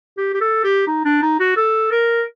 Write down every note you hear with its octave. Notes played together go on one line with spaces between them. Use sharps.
G4
G4
A4
G4
D#4
D4
D#4
F#4
A4
A#4